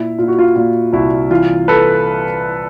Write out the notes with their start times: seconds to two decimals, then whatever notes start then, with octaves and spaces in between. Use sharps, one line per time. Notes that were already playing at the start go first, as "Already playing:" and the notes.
Already playing: A#2 E4
0.18 A#2 F4
0.28 F#4
0.39 F4
0.56 A#2 F4
0.93 C2 E4 F#4
1.30 E3 F4
1.68 A4 B4